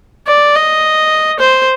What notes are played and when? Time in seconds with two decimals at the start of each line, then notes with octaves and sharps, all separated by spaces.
0.27 D5
0.55 D#5
1.39 C5